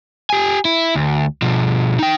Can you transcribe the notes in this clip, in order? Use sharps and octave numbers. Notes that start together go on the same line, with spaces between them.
G4 G#5
E4
D2
B2 F3
D#4 G5